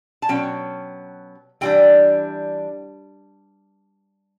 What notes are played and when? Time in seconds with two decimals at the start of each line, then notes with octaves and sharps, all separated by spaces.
0.22 A5
0.29 B2 F#3 C#4 G5
1.61 E3 G3 D4 G5